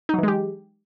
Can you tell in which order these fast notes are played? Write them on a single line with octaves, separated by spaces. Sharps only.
D#4 F#3 E3 G#3 G4